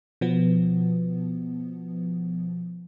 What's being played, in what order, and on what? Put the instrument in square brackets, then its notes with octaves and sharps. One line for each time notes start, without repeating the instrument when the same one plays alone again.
[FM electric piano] B2 F3 B3